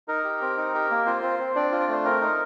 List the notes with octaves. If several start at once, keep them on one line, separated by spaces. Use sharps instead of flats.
D#4 A#4
G4
C4
D#4
G4
A#3
C4 F4 C5
C4
C4
C4 D4 D5
F4
D5
A3 C5
C4 A#4
D#4